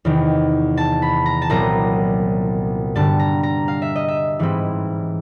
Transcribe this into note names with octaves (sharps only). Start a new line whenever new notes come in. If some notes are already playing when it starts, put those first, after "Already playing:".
E2 C3 D#3
A5
B5
A#5
A5
C2 A#2 F#3 B3 A#5
G2 D3 G3 A5
A#5
A#5
F5
E5
D#5
E5
G#2 E3 G3 C4 E4